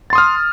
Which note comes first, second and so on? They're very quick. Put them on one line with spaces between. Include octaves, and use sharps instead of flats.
A6 C6 D#6 F6